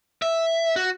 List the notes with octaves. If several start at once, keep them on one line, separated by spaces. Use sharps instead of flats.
E5
F#4